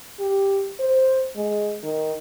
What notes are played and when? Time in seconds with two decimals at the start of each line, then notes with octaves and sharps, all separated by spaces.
0.20 G4
0.80 C5
1.36 G#3
1.83 D#3